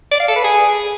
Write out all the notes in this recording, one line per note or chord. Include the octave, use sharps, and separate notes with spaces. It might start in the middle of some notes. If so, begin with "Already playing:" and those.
D5
F5
A4
B4
G#4